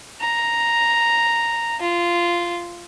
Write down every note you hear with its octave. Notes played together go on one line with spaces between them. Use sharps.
A#5
F4